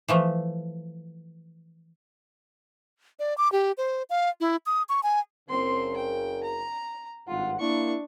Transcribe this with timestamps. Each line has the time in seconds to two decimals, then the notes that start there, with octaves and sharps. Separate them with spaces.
0.08 E3 F3 A3
3.19 D5
3.38 D6
3.52 G4
3.78 C5
4.10 F5
4.41 E4
4.66 D#6
4.89 C#6
5.03 G#5
5.49 F#1 C#3 C4 A#4 C6
5.97 G5
6.44 A#5
7.28 G#1 G2 F4 F#5
7.59 A#3 D4 E4 C#6